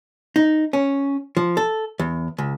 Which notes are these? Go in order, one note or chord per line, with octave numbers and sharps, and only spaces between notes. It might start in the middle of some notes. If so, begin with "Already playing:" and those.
D#4
C#4
F3
A4
E2
C#2